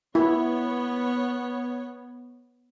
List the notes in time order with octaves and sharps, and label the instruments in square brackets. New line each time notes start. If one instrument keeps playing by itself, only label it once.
[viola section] B3 C#5 [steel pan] E4